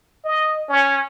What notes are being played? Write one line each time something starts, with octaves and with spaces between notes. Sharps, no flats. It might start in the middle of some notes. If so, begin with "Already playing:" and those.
D#5
C#4